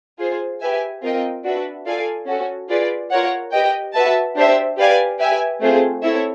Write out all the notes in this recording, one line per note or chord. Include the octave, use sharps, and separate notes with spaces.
F4 G#4 C5
G4 B4 E5 G#5
C4 F4 A#4 D#5 G5
D4 F#4 B4 E5
F4 A4 D5 F5 G#5
C#4 F#4 A4
F4 G#4 B4 D5
F4 A#4 C#5 F#5
G4 B4 D#5 G5
F#4 B4 E5 A5
D4 G4 C5 E5
G4 B4 D5 F5 G#5
G4 B4 E5 G#5
A3 C4 F4 G#4 C5
C4 E4 A4 C#5 E5